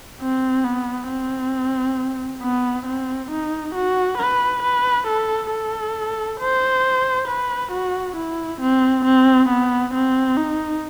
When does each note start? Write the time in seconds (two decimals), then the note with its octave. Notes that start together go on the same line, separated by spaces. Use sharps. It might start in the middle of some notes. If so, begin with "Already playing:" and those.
0.21 C4
0.65 B3
1.09 C4
2.42 B3
2.87 C4
3.31 D#4
3.75 F#4
4.18 B4
4.63 B4
5.07 A4
5.51 A4
6.40 C5
7.28 B4
7.72 F#4
8.17 E4
8.61 C4
9.05 C4
9.49 B3
9.94 C4
10.37 D#4